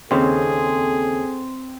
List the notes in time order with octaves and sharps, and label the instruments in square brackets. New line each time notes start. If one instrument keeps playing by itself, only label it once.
[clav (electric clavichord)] D#2 C#3 [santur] C4 C5 [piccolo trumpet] G#4 [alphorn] A4